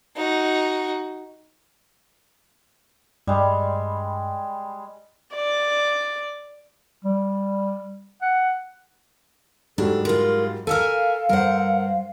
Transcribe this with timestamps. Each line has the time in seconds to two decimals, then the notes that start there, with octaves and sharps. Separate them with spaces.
0.16 D#4 F#4
3.27 G2 G3 G#3
5.35 D5
7.05 G3
8.22 F#5
9.78 G#2 F#3 G3 D4 A4
10.05 G#3 F4 A#4
10.67 A4 A#4 E5 F5 G#5 E6
11.29 G2 A#4 C5 F#5